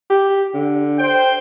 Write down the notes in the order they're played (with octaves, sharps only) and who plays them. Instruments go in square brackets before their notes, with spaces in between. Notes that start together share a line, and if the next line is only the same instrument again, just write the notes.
[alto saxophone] G4
D3
[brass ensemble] C5 G5